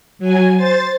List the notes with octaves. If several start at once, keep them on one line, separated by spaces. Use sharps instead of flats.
F#3 G#5
C5 A6